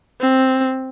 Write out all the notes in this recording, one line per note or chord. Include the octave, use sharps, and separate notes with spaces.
C4